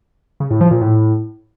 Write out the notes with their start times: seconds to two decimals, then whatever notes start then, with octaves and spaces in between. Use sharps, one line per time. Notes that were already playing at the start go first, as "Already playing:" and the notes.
0.40 C#3
0.50 A2
0.61 F3
0.71 A#2
0.81 A2